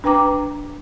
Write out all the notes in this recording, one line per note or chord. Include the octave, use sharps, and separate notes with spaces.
D4 B4 G5 A#5 D6